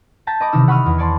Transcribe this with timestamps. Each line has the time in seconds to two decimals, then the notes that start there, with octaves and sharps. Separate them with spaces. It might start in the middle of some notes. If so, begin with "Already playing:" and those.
0.27 A5 A#5 G6 A6 B6
0.40 D#5 A#5 B5 D6
0.52 C3 D#3 E3 D#4 E6
0.68 F#5 B5 C#6 D#6 F6
0.86 E2
0.98 C#5 D5 A5 C6